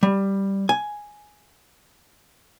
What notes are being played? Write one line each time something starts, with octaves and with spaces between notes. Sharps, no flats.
G3
G#5